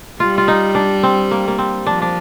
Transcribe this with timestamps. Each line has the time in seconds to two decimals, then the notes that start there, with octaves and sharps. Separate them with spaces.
0.20 G3 F4
0.38 F4
0.48 D#4
0.75 D4
1.03 C4
1.31 A#3
1.48 A#3
1.58 C4
1.86 F3 D4
2.02 D4